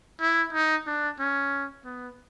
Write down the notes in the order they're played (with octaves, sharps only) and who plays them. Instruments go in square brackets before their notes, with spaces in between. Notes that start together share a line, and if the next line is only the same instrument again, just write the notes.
[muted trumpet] E4
D#4
D4
C#4
B3